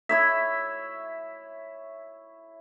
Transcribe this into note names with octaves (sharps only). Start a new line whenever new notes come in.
E4 C#5 E5